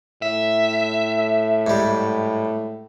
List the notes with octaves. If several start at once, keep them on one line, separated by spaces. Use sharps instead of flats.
A2 E5
G#2 G3